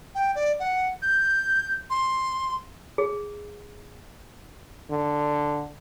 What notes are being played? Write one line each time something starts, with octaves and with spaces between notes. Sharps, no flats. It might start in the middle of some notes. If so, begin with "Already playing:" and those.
G5
D5
F#5
G6
C6
G#4
D3